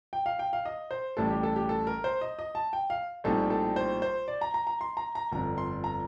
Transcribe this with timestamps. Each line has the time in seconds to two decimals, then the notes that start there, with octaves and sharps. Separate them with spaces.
0.13 G5
0.26 F5
0.39 G5
0.53 F5
0.65 D#5
0.91 C5
1.17 A1 A2 G3 A4
1.30 G4
1.43 A4
1.56 G4
1.69 A4
1.87 A#4
2.04 C5
2.21 D#5
2.39 D#5
2.55 A5
2.73 G5
2.90 F5
3.24 A#1 A2 G3 C4 D#4 A4
3.50 A4
3.76 C5
4.02 C5
4.28 D5
4.41 A#5
4.54 A#5
4.67 A#5
4.81 C6
4.97 A#5
5.15 A#5
5.32 G1 F2 D3 A#5
5.58 C6
5.84 A#5